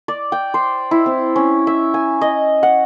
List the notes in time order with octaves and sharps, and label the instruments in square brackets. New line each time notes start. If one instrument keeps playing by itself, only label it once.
[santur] D5
G5
C5
E4
C4
C#4
E5
G#5
D#5
F#5